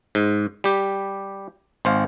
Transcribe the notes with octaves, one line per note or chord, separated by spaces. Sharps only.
G#2
G3 G4
G#1 C5 F5